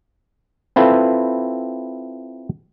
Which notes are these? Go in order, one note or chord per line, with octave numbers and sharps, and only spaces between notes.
C4 E4 F4 A4 B4